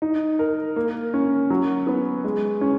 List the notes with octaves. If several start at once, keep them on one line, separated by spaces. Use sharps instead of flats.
D#4
A#4
A#3
C#4
F#3
B3
G#3
C#4